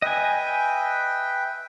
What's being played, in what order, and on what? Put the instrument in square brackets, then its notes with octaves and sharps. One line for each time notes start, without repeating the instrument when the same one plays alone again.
[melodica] B4 E5 G5 [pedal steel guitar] D#5 G#5